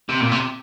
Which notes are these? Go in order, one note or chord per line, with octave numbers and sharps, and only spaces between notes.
C3
A#2
C3